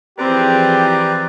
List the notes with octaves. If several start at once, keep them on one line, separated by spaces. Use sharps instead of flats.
E3 F3 C4 G4 G#4 B4 D5 A#5